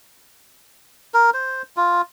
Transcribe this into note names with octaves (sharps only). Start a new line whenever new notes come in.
A#4
C5
F4